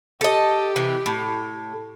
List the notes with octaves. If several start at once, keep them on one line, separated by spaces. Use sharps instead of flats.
G4 A4 D#5
C3 E3
A2